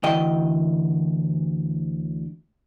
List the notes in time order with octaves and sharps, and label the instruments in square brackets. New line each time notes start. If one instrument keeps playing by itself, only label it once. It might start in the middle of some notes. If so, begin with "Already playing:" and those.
[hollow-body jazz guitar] D2 E3 D#5 G5